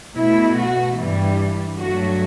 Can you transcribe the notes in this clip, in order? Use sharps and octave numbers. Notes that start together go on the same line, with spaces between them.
B2 A3 E4
F#4
G2 E3 G3
G2 F#3 A3 F#4